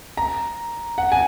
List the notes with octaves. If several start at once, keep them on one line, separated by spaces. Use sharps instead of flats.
A#5
F#5
G#5